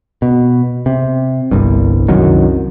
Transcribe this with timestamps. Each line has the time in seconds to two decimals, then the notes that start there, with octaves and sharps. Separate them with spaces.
0.22 B2
0.86 C3
1.51 G1 C2 G2
2.08 C2 F#2 D#3 F#3